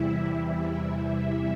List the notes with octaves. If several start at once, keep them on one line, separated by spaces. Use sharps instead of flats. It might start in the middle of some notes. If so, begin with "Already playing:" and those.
Already playing: E2 C3 E3 G3 E4 E5